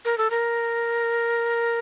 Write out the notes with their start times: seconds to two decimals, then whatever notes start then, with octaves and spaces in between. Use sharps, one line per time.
0.05 A#4
0.18 A4
0.30 A#4